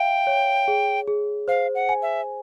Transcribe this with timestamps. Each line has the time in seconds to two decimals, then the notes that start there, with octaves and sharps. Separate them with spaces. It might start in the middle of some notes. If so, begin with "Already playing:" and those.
Already playing: E5 F5 G5
0.27 C#5
0.68 G#4
1.07 G#4
1.48 C5 F5
1.75 F#5
1.89 G#5
2.02 E5